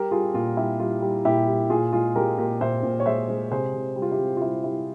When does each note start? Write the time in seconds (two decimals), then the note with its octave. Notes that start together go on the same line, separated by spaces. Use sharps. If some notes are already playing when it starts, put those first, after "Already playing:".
Already playing: G3 G4 A#4
0.11 G3 F4 G#4
0.34 A#2 F4
0.57 G3 E4 G4
0.79 G3 F4
1.02 G3
1.25 A#2 E4 G4
1.48 G3
1.70 A#2 F4 G#4
1.92 G#3 F4 G#4
2.16 G#3 G4 A#4
2.38 A#2 G4 A#4
2.61 A#2 C5 E5
2.83 A#2
3.00 C#5
3.06 G#3 C5 E5
3.28 G#3
3.51 C3 G#4 C5
3.74 C3
3.96 G3
4.02 F4
4.12 E4 G4
4.19 C3
4.37 F4
4.41 G3 E4
4.64 G3 E4